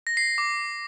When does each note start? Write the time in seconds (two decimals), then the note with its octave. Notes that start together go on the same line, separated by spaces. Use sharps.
0.07 A#6
0.17 C7
0.28 C7
0.38 D6